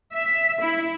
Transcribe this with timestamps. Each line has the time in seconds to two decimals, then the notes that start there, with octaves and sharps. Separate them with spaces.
0.13 E5
0.60 E4